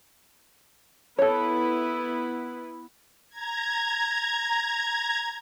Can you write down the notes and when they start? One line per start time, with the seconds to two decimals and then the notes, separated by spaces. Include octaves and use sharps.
1.19 B3 E4 A4 B4 C#5
3.29 A#5 G#6